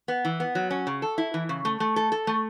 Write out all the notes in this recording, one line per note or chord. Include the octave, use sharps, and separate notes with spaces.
B3
E3
B3
F#3
C#4
C#3
A4
E4
E3
C#3
A3
A3
A4
A4
A3